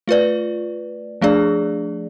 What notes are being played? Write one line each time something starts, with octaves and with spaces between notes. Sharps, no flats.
A3 F4 B4 D5
F3 A3 D4 G#4 D5